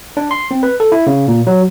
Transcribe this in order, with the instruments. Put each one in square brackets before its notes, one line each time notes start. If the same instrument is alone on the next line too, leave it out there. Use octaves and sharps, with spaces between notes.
[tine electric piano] D4
C6
C4
B4
A4
E4
C#3
A#2
F#3